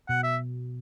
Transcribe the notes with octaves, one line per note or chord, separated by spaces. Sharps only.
B2 F#5
E5